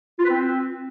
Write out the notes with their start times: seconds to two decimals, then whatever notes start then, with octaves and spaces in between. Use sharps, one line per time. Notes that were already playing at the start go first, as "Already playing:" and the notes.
0.19 F4
0.24 B4
0.29 C4